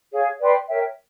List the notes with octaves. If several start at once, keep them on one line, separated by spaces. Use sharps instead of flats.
G#4 C#5 F5
B4 D5 G5 C6
A#4 C#5 E5 G5